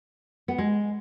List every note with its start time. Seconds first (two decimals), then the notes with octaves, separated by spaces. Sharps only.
0.48 B3
0.58 G#3